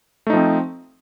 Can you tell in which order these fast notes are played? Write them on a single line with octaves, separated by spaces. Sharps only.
A3 D#4 F3 C4